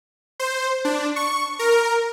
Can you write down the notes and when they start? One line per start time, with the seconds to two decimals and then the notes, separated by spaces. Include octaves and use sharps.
0.40 C5
0.85 D4
1.16 C#6
1.59 A#4